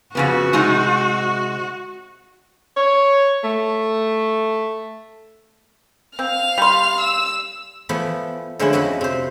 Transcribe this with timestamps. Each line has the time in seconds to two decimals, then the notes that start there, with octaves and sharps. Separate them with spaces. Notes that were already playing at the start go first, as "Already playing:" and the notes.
0.15 F2 C#3 B3 F#4
0.53 C3 G#3 D#4
2.77 C#5
3.44 A3
6.19 C4 F5 F6
6.58 G3 C6
7.01 E6
7.89 E3 F3 A3 B3
8.59 D3 F3 G#3 A3 C#4 E4
8.73 F2 F3 F#4 D#5 F#5 B5
9.01 C3 C5